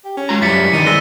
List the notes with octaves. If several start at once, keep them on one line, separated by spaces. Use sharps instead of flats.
G4
C#4
G#3 F4 A#5
F#2 G3 E4 A6 B6 C#7
D#3 E3 D4 D#4 D#7
G#3 E6 A#6 G7